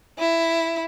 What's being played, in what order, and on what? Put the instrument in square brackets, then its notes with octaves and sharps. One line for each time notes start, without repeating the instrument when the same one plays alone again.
[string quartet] E4